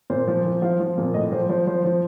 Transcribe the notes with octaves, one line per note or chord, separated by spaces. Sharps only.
A#2 C5
F3
F3
F3 F5
F3
A#2
A2 D#5
F3 C5
F3 C5
F3 C5
F3